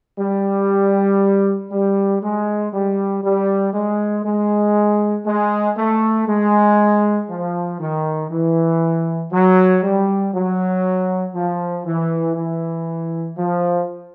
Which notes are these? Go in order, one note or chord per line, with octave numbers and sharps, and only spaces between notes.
G3
G3
G#3
G3
G3
G#3
G#3
G#3
A3
G#3
F3
D#3
E3
F#3
G3
F#3
F3
E3
E3
F3